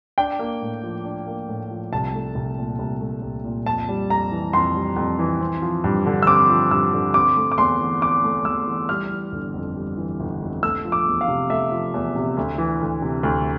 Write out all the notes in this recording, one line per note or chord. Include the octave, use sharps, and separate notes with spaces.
D4 G5
A#3
A2
F3
D4
A#3
A2
F3
C2 A5
A3
C2
A#2
C2
A3
C2
A#2
F2 A5
G3
F2 A#5
E3
F2 C6
G3
F2
E3
C4
F3
G2
D3
E6
C4 D6
F3
G2 E6
D3
C4 D6
A3
D6
E2 C6
E3
C4 D6
A3
E2 E6
E3
G3 F6
E3
G1
F2
G3
E3
G1
F2
A3 E6
F3
D6
E2
F5
C3
A3 E5
F3
E2
C3
D2
E3
D2
C3
D2